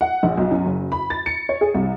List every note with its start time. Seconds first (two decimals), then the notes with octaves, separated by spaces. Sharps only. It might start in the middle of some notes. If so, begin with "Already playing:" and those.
0.01 F#5
0.23 A#1
0.37 B1
0.51 F#2
0.65 F#1
0.92 B5
1.10 A6
1.26 C#7
1.49 C#5
1.61 G#4
1.74 C2